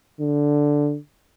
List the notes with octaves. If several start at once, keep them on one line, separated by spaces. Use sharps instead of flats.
D3